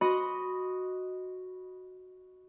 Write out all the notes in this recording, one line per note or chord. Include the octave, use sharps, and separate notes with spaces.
F#4 D#5 B5 C6